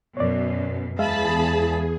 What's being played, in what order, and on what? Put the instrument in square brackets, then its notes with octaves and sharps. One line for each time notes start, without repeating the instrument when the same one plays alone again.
[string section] F#2 B2 [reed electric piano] C#5 D5
[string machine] E2 G#4 [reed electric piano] G#3 E5 F5 [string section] A5 B5